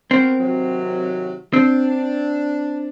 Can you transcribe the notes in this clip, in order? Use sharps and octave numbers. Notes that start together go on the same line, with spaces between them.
B3 C4 F#4 A#4
C3 D#3 F#3
C4 D4